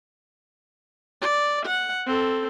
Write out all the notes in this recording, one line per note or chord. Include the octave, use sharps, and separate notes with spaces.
D5
F#5
C4 A4